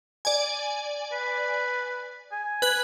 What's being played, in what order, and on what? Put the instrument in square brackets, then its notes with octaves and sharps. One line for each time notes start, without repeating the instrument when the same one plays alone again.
[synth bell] D5 G#5
[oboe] B4
G#5
[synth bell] B4 F#6 G#6